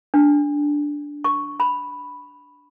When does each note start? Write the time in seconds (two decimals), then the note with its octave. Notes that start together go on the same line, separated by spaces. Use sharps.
0.14 D4
1.24 C#6
1.60 B5